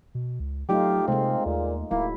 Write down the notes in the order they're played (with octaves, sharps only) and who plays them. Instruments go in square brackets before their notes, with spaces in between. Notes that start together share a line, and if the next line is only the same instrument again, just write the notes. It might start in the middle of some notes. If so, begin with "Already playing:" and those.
[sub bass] B2
C#2
[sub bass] F#3 [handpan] A3 D#4 F4 [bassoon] G4
[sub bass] C3 [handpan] G#3 A#3 [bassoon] C4
[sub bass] D#2 [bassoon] A#2
[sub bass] D1 [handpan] F#3 E4 [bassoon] A#3